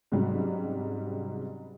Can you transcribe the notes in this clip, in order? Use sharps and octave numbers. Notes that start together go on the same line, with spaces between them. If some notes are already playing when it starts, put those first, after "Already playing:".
G#2 C3 F#3 G3 C#4